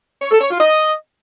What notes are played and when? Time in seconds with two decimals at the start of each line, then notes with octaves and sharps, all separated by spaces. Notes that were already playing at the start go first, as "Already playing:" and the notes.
0.21 C#5
0.31 A4
0.41 C#5
0.50 F4
0.60 D#5